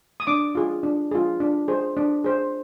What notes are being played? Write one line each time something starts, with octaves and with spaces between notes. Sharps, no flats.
D#6
D4 D6
F4 G#4
D4
F4 G#4
D4
G#4 C5
D4
G#4 C5